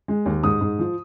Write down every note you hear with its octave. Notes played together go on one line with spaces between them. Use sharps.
G#3
D#2
G#2 D#6
G#2
F3